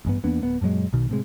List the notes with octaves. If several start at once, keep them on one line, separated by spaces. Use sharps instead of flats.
A1 G2 B3
E2 A#3 B3 D4
D1 B3
F#2 A#2 F#3 G#3
B1 B2 D#3
A2 C3 G#3